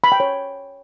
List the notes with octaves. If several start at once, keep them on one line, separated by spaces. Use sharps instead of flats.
B5
G5
C#5